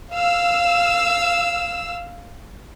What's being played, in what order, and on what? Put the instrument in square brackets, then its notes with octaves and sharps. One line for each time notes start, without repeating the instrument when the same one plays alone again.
[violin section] F5 E6